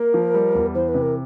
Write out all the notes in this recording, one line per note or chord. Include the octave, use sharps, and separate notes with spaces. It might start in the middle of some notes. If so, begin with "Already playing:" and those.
Already playing: A#3 A#4
F3
G3
E2
E3 C5
B4
C3
A#4